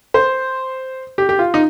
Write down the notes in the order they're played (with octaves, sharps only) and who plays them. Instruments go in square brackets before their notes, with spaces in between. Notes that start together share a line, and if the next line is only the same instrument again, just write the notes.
[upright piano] C5
G4
G4
F4
D#4